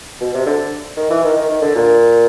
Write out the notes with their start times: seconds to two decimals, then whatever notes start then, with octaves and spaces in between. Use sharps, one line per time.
0.21 B2
0.34 C3
0.46 D3
0.97 D#3
1.10 E3
1.24 D#3
1.37 D#3
1.49 D#3
1.62 D3
1.75 A#2